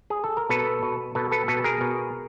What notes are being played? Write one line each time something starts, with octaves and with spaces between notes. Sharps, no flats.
G#4
A4
A#4
B2 A4 B4
B2
B2 A4 B4
A4 B4
B2 A4 B4
G#4 A#4
B2